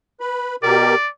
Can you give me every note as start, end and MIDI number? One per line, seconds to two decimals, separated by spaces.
0.20 0.56 71
0.20 0.56 83
0.63 0.95 47
0.63 0.95 67
0.63 0.95 70
0.63 1.09 74